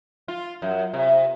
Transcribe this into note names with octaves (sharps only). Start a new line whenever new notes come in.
F4
F#2
C3